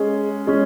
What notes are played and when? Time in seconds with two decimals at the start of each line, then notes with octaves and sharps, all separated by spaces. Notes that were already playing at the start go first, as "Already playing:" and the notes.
Already playing: G#3 C#4 G#4
0.47 G#3 C#4